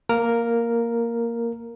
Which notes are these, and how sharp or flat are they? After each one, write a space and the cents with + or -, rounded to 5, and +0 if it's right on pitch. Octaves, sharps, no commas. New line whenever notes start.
A#3 +0 A#4 +0